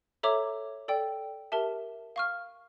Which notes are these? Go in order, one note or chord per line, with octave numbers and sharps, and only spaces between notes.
A4 C#5 E5 A#5 D6
A4 D5 G5
G4 A#4 E5 A5
F5 C#6 F6